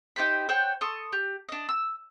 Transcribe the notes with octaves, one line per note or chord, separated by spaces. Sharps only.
D#4 G4 C5 B5
C5 C#5 F#5 G5
A4 C6 C#6 D#6
G4
D4 D#5
E6